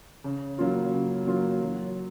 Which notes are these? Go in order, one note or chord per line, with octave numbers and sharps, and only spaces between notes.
C#3
F#3 A#3 C#4 F4
C#3
F#3 A#3 C#4 F4
F#3